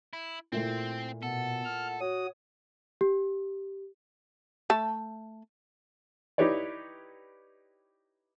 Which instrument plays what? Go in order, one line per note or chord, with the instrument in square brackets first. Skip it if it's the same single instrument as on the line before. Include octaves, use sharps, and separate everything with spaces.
[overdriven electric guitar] E4
[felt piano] A#2 A3 E4 [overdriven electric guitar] C4
[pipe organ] B2 [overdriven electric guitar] A4 [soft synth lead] F#5
[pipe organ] F6
[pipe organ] F#4 D#6 [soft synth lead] C#5
[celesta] G4
[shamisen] A3 A5
[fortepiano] D#4 E4 G4 B4 C#5 D5